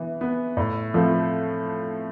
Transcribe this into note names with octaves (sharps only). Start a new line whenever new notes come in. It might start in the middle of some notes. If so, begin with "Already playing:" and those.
Already playing: E3 B3
B3
A2
F3 A3 C4